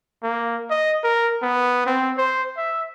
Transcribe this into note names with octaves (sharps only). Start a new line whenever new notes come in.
A#3
D#5
A#4
B3
C4
C5
E5